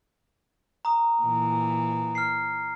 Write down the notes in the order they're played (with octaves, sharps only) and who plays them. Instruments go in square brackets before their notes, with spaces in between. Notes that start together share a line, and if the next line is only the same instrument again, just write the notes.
[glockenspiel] A#5 D#6
[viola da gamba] A#2 E3
[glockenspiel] F6 C7